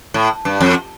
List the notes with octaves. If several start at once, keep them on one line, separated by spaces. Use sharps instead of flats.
A2
G2
F2